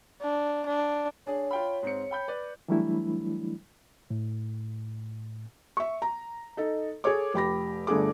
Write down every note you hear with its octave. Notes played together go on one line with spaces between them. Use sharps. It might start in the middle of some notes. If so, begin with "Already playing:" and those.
D4
D4
D4 G#4 C#5
F4 G5 B5
G#2 C4 C#7
G5 B5 G6
B4 D5
E3 F#3 G3 A3 D4 E4
A2
E5 C#6
A#5
D#4 A4 D#5
G#4 A4 C#5 D6
F1 G4 B5 A#6
G1 D3 A3 G#4 D6